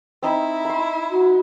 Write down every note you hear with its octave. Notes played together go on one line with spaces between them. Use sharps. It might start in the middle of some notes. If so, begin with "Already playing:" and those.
C4 D#4 E4 C5
B5 C6
F#4